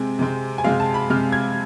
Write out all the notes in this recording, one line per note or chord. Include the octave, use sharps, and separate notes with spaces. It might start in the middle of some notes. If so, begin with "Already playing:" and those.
Already playing: C3 G#3 C4 G#5
C3 G#3 C4
G#5
C3 G#3 C4 F5
A5
B5
C3 G#3 C4 F6
G#6